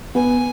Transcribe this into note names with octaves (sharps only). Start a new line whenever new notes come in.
B3 G#5